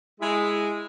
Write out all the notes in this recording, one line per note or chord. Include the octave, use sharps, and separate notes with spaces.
G#3 E4